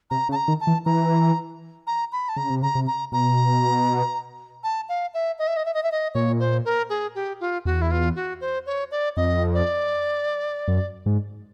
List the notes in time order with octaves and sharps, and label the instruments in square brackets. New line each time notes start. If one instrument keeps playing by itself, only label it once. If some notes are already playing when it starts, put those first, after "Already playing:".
[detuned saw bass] C3 [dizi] A#5
[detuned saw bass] C#3
[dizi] A5
A#5
[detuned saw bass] D#3
[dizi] A5
[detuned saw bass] E3
[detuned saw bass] E3 [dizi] A#5
[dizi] A#5
B5
A5
[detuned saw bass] C#3 [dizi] A#5
[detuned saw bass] C3
[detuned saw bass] C#3 [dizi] A#5
[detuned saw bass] C3
[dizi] A#5
[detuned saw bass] B2 [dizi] A#5
[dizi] A5
F5
E5
D#5
E5
D#5
E5
D#5
E5
D#5
[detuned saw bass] A#2 [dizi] C#5
[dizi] C5
A#4
G#4
G4
F4
[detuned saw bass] E2 [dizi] F#4
[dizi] E4
F4
F#4
C5
C#5
D5
[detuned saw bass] F2 [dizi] D#5
[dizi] D5
[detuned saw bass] F#2
G#2